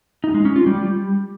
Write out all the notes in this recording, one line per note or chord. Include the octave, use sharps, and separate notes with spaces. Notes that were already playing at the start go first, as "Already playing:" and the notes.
D#4
G#3
C#4
F4
G3